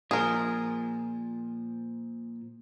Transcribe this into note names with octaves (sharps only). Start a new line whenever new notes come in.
A#2 F3 G#4 A#4